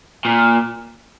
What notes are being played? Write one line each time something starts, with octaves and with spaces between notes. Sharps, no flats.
A#2